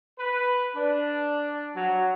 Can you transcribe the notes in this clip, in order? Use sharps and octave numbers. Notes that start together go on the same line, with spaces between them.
B4
D4
F#3